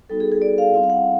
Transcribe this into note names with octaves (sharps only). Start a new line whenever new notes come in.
G3 B3 D#4 F#4 A4
G#4
G#4
D5
F5
G3 C4 E4 F5
F5
F#5